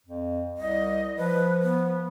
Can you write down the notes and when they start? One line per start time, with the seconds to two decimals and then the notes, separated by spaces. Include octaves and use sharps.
0.06 F2
0.57 C2 D#5
1.17 F3 B4
1.63 B3